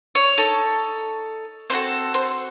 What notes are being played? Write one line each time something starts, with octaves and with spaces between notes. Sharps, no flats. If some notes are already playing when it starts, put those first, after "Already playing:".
C#5
D#4 A4
C4 D#4 F#4 A4 C5
C5